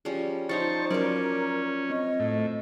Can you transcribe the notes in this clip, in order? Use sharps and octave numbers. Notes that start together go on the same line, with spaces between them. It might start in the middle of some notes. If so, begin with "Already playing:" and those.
F3 G3 C#4 G#4
F3 D#4 C5 C#5 A5 C#6
F#3 A#3 C#4 A#4 D5
C4 D#5
A2